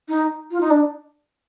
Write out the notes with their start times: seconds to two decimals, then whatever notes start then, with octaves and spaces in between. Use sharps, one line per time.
0.09 D#4
0.51 F4
0.61 D#4
0.70 D4